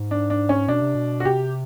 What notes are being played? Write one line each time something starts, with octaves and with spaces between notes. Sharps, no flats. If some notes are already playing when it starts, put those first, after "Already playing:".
Already playing: G#2
D4
D4
C#4
B2 D4
C3
B2
F#4
C3 G4